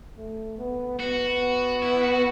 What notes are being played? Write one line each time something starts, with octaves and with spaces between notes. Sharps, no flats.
A3
B3
B3 F#4
E4
F#4